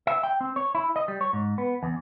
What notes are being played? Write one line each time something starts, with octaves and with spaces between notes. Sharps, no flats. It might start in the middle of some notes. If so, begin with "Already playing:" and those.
E5
G5
C4
C#5
E4
D#5
G3
C#5
G#2
B3
E2